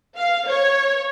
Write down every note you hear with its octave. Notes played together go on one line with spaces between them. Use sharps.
F5
C#5